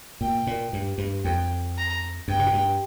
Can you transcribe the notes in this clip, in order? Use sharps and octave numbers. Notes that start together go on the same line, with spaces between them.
A#2 G5
A#2
G2
G2
F2 G5
A#5
G2 G5
C3
A#2
G2